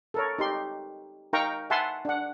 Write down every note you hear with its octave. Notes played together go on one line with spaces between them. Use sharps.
A4 A#4 C#5
D#4 G4 C6
D#4 A#4 F5 G5 A#5 C#6
E5 F#5 G#5 A5 B5 C6
D4 F#5